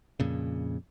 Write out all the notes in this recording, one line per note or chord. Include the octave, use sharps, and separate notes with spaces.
F2 A#2 C#3